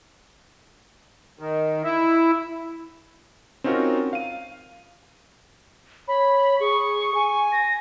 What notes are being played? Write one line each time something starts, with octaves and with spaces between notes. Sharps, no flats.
D#3
E4
C4 C#4 D#4 F4 F#4 A#4
F5 D#7
C#5 B5
G#4 C#6
G#5
A#6